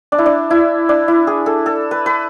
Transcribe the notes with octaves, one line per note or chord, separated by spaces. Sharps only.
D4
E4
D4
E4
D4
E4
G#4
A4
A4
B4
B4